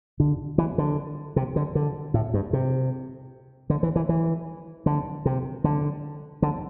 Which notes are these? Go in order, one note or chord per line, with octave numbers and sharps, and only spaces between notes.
D3
E3
D3
C3
D3
D3
A2
G2
C3
D3
E3
E3
E3
D3
C3
D3
D3